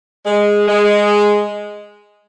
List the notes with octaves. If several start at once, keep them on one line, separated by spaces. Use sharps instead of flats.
G#3
G#3